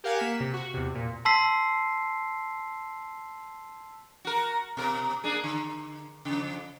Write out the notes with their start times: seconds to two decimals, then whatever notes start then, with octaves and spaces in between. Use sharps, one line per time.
0.04 G4 A#4 F5 F#5 G#5
0.18 A#3 B6 E7
0.40 C3
0.53 F#4
0.74 E2 C3
0.95 A#2
1.25 A5 C6 E6 B6 C7
4.25 F#4 A#4
4.77 B2 A#4
5.24 A#3 D4 G#4
5.44 D3
6.25 F2 C#3